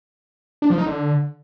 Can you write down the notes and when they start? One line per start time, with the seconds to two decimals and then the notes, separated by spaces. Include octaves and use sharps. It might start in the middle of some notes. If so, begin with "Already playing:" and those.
0.62 D4
0.70 F3
0.78 D#4
0.86 D3